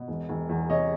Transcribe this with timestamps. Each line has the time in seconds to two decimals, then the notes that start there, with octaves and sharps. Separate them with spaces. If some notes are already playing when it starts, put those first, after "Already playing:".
Already playing: B2
0.08 E1
0.29 E1
0.49 E2
0.69 C3 C#5 D#5